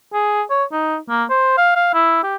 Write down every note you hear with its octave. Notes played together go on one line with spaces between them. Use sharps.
G#4
C#5
D#4
A#3
C5
F5
F5
E4
G4